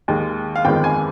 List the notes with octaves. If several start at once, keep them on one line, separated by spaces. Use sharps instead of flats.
D#2 D#3 G#3
F5
G1 F2 D#3 G#3 G5
G#5